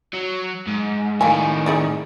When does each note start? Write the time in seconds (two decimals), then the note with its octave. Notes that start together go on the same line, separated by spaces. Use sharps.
0.13 F#3
0.67 G#2
1.21 A2 D#3 G3 A#3 G#5
1.66 D#4 G#4 D5